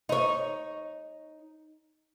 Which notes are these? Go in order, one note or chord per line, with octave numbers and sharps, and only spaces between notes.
D#4 C#5